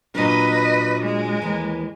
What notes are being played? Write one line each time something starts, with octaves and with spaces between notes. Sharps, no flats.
A#2 F#3 D4 B4 D#5
G#3
D#2 E3